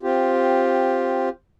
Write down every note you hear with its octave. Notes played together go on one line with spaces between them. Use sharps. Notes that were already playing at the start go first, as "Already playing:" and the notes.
C4 F4 G4